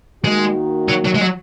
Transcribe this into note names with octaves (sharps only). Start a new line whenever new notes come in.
D#3 G#3 A#3 D#4 F#4
F#3
F#3
G#3
F#3